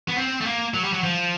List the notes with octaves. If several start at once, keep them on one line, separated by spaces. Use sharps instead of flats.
B3
C4
A3
A#3
F#3
G3
F#3
F3